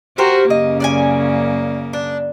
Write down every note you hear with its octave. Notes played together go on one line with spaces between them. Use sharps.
F#4 G4 A#4 C5
F#2 C#3 A#3 D#5
D5 F#5 G#5
D4